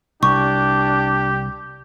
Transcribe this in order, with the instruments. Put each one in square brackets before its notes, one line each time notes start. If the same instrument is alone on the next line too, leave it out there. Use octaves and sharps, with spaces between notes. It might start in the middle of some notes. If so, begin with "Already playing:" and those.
[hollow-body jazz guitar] C2 [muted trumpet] D4 [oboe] G4 [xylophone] C#6